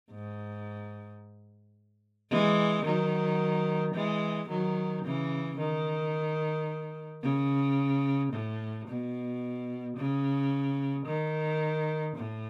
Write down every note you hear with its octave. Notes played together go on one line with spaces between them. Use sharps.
G#2
E3 G#3
D#3 F#3
E3 G#3
D#3 F#3
C#3 E3
D#3
C#3
A2
B2
C#3
D#3
A2